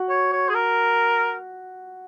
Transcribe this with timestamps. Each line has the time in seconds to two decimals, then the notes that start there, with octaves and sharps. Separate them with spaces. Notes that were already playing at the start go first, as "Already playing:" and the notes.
Already playing: F#4 F#5
0.09 C#5
0.33 C#5
0.49 G#4
0.54 A#4